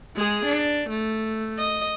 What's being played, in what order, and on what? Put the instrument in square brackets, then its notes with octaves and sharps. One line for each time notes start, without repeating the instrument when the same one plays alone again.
[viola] G#3 G#4
D4
A3
D#5